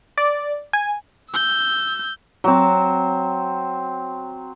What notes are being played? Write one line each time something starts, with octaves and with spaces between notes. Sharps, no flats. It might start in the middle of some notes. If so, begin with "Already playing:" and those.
D5
G#5
E6 G6
F#3 C4